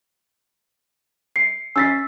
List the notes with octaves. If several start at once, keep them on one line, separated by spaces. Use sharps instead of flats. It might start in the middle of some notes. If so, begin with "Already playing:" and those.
C7 C#7
C#4 E6 A6 B6 C7